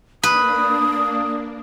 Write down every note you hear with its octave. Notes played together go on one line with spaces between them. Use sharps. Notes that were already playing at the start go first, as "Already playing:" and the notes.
A#3 D4 B4 D#6